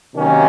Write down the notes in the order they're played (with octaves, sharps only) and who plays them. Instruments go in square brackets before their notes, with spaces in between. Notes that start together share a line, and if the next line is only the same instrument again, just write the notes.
[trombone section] C3 D#3 F#3 A#3 C#4